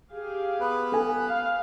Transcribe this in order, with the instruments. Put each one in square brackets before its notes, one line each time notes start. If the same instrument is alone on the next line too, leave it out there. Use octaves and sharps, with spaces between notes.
[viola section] G4 G#4 F5
[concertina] B3 B4
[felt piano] A4 G#5
[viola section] F5